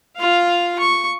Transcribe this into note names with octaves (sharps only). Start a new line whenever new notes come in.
F4 F5
C#6